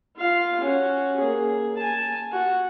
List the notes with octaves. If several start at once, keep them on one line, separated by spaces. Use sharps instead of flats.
F4 F5
C#4 F#4
A#3 G#4
G#5 A5
F#4